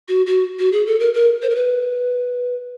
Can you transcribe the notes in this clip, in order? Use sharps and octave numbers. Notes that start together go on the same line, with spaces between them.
F#4
F#4
F#4
G#4
A4
A#4
A#4
C5
A#4
B4